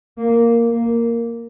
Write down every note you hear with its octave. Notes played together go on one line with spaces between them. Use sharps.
A#3
A#3